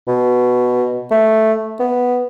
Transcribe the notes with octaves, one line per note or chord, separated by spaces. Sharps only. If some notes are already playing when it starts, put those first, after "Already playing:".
B2
A3
B3